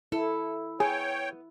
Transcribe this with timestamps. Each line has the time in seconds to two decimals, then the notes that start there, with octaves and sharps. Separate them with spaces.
0.12 E4 A4
0.80 B3 G#4 C#5 G5